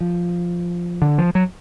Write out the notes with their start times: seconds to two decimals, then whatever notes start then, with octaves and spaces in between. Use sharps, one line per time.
0.01 F3
1.02 D3
1.18 F3
1.35 F#3